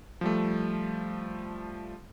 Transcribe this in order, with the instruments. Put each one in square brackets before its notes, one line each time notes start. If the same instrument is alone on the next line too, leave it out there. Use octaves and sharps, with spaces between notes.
[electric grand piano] F3 G3 A3